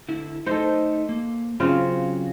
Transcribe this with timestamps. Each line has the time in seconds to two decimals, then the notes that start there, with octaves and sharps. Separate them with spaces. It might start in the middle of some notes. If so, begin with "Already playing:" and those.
0.08 D3 E4
0.46 A3 D#4 A4 C5 D#5
1.09 A#3
1.60 C#3 F#3 C4 F4